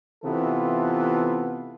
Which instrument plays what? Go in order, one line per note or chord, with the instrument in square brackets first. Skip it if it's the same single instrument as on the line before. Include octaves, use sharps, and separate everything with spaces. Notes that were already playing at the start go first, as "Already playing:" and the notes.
[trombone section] C3 E3 B3 F4 A4